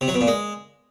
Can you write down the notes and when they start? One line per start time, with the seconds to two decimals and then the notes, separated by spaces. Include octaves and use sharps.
0.01 C3
0.08 F#3
0.14 B2
0.21 A#2
0.27 G#3